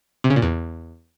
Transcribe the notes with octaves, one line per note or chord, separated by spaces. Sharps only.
C3
C#3
A#2
E2